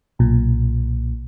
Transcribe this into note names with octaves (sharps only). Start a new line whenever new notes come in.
B1 A#2